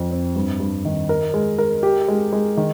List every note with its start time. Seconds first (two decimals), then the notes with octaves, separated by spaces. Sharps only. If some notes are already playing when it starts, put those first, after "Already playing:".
Already playing: F2 C4
0.11 C4
0.36 G2
0.60 G2
0.85 D#3
1.09 A#4
1.34 G#3
1.58 A#4
1.83 G4
2.08 G#3
2.33 G#3
2.57 D#3